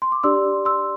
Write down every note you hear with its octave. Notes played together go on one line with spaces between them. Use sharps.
C6
D6
D4 G4 D5 C6 E6
C6 E6